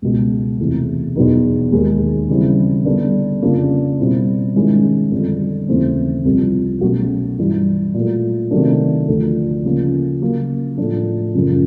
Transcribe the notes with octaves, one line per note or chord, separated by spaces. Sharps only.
C#2 B2 G#3
E2 C3 E3 A3
E2 B2 F#3 B3 D#4
D#2 D#3 G#3
C#3 E3 G3 C4 E4
D3 G3 B3 D4
F2 C#3 F3 A#3 D4
B2 G3 C4 E4
G#2 D#3 G#3 C#4 E4
F2 D3 G3
D#2 C#3 E3 A3 C4
C2 C3 F3
B2 F#3 A3 C#4 F#4
G2 E3 G3
A#2 F#3 A3
C3 D#3 F#3 A3 D4
D2 D3 F3
C#3 F3 A#3 C#4
C#3 F#3 A#3
A2 F3 A3 D4
F#2 C#3 F3